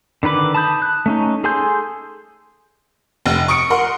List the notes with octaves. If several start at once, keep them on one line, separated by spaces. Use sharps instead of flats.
D3 D#3 B4 B5 D6
A5 B5 D#6 G6
F#6
A3 C#4 D#4
G#4 A4 G#5 C6 G6
F1
C#6 D#6 C#7 D7
A#4 F#5 C6